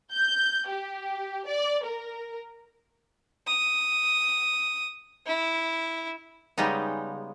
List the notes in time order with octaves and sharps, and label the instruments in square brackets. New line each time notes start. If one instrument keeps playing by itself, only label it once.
[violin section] G6
G4
D5
A#4
[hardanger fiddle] D#6
E4
[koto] C#3 G3 G#3 B3 D#4